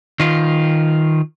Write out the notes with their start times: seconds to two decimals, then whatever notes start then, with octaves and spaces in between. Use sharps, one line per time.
0.20 D#3 F4